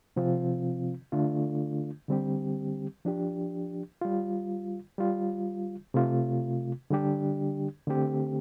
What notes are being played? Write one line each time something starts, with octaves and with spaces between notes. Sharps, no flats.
C3 F3 C4 F4
D3 A3 D4 F4
D3 G3 C4 G4
F3 D4 G4
G3 F4
G3 F4
C3 A3 F4
D3 G3 D4 G4
D3 A3 C4 G4